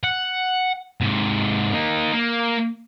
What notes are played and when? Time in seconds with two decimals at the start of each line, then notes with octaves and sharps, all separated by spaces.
0.04 F#5
1.01 G#2 C3
1.72 A#3 D#4
2.13 A#3